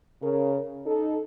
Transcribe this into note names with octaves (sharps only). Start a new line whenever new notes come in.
C#3 A#4
D#4 A4